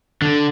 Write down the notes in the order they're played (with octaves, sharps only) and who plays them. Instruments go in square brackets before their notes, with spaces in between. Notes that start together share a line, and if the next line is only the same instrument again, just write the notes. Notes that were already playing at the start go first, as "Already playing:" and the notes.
[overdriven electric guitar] D3